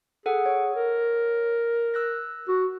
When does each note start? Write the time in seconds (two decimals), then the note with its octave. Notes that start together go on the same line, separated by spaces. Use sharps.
0.26 G#4 A4 F#5
0.46 C#5
0.75 A#4
1.94 E6 F#6 A#6
2.48 F#4